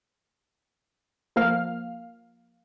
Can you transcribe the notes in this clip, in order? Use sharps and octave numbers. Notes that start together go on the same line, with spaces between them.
F3 A#3 F5 F6